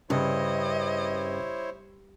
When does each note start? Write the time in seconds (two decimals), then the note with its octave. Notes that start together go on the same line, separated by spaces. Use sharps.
0.10 G2 C#3 E4 C5 C#5 D#5